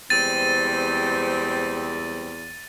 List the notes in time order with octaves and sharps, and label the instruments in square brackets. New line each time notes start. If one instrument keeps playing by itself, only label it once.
[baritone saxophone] E2 [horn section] G3 G#3 C4 [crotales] A6 D#7